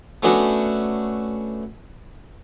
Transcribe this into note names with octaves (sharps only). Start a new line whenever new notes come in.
A3 B3 C#4 D4 F#4 A4